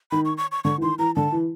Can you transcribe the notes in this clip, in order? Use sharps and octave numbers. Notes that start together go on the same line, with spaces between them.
D#3 B5
C#6
C#6
C#6
D3 C#6
E3
D#3 C6
E3 A#5
D3 A5
E3